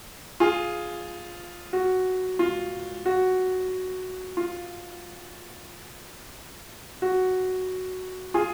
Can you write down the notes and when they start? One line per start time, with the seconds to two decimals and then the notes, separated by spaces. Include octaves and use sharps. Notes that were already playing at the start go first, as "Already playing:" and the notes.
0.40 F4 G#4
1.73 F#4
2.39 F4
3.06 F#4
4.37 F4
7.02 F#4
8.34 F4 G#4